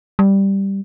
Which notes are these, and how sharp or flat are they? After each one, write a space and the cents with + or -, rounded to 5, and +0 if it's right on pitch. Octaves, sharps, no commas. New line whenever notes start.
G3 +0